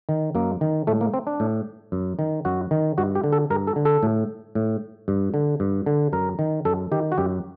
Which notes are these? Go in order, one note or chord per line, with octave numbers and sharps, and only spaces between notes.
D#3
F#2 A#3
D#3
A2 A3
A#3
C4
D4
A2
F#2
D#3
F#2 F#4
D#3
G2 F#4
G4
D3
A4
G2 A#4
A4
D3
A4
A2
A2
G2
D3
G2
D3
F#2 A#4
D#3
F#2 A4
D#3 G4
F#4
F#2 G4